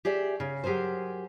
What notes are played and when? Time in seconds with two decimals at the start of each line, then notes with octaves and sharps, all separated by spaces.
0.05 G4 G#4 D5 E5
0.40 C#3
0.64 F#3 G4 G#4 A#4 C5